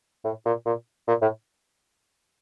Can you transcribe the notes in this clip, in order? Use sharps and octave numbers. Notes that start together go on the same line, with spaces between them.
A2
A#2
A#2
A#2
A2